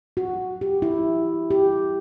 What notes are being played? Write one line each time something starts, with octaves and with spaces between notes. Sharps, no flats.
F#4
G4
E4
G4